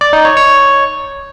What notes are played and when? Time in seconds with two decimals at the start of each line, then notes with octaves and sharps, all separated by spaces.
0.01 D5
0.13 D#4
0.25 C#5
0.37 C#5